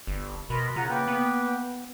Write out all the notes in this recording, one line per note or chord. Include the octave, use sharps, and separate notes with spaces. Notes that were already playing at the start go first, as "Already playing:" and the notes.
G1
B2 A#4 B5 C6
C#3 F4 F#5 A#5
A#3 B4 G5
B3